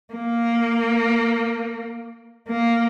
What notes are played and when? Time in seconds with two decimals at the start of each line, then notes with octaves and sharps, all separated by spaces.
0.14 A#3
2.48 A#3